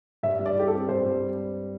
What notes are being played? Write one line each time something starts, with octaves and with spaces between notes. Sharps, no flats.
G2 E5
G3
D5
E4 G4
A4
C4
G2 C5
G3